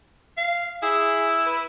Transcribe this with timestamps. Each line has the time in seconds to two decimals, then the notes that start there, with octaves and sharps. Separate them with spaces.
0.37 F5
0.83 E4 G#4
1.46 B4